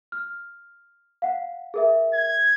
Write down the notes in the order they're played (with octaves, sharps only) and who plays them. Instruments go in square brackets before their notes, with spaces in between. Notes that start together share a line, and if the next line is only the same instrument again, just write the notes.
[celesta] F6
F5 F#5
G#4 A#4 E5
[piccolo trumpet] G#6